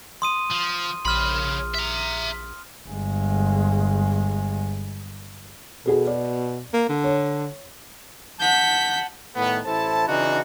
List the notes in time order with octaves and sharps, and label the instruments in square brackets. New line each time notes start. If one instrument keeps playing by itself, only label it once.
[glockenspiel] C6 D#6 D#7
[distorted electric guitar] F3
[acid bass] A#1 [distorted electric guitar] C#3 B5 [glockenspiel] C6 F6
[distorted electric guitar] E5 A#5
[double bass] G1 G#3
[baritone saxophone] B2 [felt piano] F#4 G#4 A4
[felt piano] D5
[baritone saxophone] A#3
D3
[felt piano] C#5
[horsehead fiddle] F#5 A5 [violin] G6 B6
[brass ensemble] A2 D#3 A3 B3
A1 E4 A4 C5 A5
C#3 E3 D4 D#4 F4 F#4